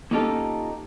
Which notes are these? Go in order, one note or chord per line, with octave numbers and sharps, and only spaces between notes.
A#3 C#4 D#4 F4 G4 A4